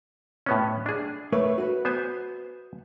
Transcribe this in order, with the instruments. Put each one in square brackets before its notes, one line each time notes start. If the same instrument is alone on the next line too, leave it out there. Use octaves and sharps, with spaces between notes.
[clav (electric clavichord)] A2 B3 C#4
D4 G#4
[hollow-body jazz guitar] A3 B4 C#5
F#4 B4
[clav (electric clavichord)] B3 C5 G#5